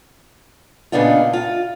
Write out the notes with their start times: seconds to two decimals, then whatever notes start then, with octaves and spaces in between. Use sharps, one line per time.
0.92 A#2 C#3 B3 D4 D#4 F4
1.33 F4